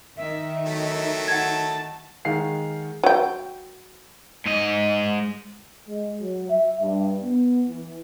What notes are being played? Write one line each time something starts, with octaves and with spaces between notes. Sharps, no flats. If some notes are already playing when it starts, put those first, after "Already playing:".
D#3 E5
F#3 A3 E4
F#5 A5 G#6
D#3 G#3 F5 F#5 C7
F#3 G5
G#2 D#5
G#3
F#3
E5
G2
B3
E3